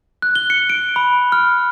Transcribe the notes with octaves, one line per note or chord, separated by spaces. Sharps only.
F#6
G7
C#7
D7
B5
F6